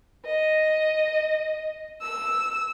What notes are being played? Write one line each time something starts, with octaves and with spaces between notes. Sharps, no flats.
D#5
E6